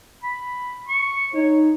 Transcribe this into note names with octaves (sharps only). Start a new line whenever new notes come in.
B5
C#6
D#4 C#5